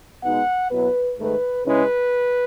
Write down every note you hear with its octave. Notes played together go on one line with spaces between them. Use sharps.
B2 G#3 B3 D#4 F#5
B2 F#3 B3 E4 B4
G#2 D#3 A3 B4
C#3 G#3 C#4 E4 B4